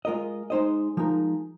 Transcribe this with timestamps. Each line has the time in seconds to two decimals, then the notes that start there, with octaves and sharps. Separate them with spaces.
0.05 G#3 F4 A#4 D#5
0.50 G#3 D#4 C5 D#5
0.97 F3 G#3 D#4 A#4